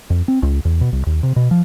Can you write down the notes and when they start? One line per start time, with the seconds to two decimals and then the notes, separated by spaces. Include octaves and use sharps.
0.10 F2
0.28 C4
0.43 C#2
0.65 E2
0.81 B2
0.92 C2
1.07 D#2
1.23 C3
1.36 B2
1.51 F3